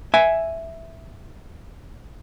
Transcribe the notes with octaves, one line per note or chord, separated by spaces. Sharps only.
E5 G#5